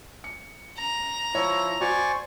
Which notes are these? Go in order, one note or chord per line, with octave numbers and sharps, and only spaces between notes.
C#7
A#5
F3 E4 C#5
F#4 C5 D5 G#5 C#6